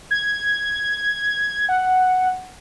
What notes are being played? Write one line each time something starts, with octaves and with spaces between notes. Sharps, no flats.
G#6
F#5